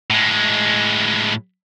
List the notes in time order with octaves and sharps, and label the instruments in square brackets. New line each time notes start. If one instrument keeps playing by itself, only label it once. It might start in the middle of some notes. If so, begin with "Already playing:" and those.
[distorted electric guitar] A2 G#3